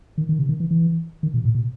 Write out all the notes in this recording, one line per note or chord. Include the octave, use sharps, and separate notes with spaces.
D#3
D#3
C3
D#3
E3
E3
D#3
B2
A2
B2